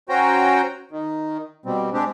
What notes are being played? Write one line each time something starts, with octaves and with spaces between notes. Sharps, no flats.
C#4 F#4 C5 G5 A#5
D#3
B2 G3 C4
G#3 C4 D4 G4